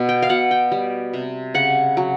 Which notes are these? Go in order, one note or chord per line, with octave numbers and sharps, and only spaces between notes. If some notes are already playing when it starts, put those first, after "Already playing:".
Already playing: B2
G5
F5
B2 F#5
G5
G3
C3
C#3 F#5
F#3